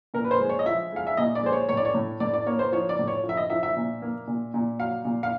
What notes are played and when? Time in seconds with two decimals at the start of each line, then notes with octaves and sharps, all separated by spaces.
0.14 A#2 A#4
0.24 B4
0.31 C5
0.40 G#3
0.49 C#5
0.59 D#5
0.66 F3 E5
0.92 G#3 F5
1.07 E5
1.17 A#2 D#5
1.35 D5
1.43 G#3 C5
1.52 C#5
1.69 A2 C#5
1.77 D5
1.85 C#5
1.94 A2
2.20 A2 D5
2.34 D5
2.46 A#3 C#5
2.59 C5
2.72 F3 C#5
2.89 D5
2.99 A2
3.07 C#5
3.24 F3
3.29 E5
3.37 D#5
3.50 F3 E5
3.63 E5
3.76 A#2
4.02 A#3
4.27 A#2
4.54 A#2
4.80 F#3 F5
5.05 A#2
5.23 F5